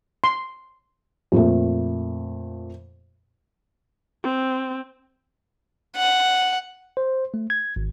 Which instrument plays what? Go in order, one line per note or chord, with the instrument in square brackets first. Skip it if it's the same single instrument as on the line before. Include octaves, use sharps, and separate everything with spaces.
[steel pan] C6
[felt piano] F2 A#2 A3
[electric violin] C4
[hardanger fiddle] F#5
[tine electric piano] C5
A3
G#6
G#1